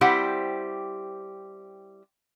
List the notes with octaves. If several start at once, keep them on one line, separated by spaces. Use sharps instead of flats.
G3 C4 E4 G4 C5 F#5